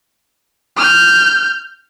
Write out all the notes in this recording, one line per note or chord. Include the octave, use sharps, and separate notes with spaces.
F6 G6